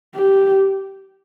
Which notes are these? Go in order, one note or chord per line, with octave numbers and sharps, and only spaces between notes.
G4